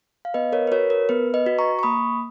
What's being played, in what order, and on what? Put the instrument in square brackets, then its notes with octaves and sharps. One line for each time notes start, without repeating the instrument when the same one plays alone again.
[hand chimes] F5
B3 B4 D#5
A#4 C#5
B4
F#4 A#4 C#5
A#4
B3 B4
B4 D#5
F#4
A#5 C#6
C#6
A#3 B5 D#6